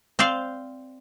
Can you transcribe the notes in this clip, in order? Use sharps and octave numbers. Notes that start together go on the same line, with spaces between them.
C4 C5 D5 F5